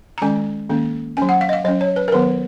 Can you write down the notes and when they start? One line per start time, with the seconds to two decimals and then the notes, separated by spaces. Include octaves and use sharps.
0.18 A#5
0.22 D#3 G#3 C#4 G#5
0.69 D#3 A#3 C#4
1.17 F#3 C#4 G#5
1.29 F#5
1.41 F5
1.49 D#5
1.53 F5
1.65 F#3 C#4 D#5
1.81 C#5
1.96 B4
2.08 A#4
2.12 D#3 F#3 B3 B4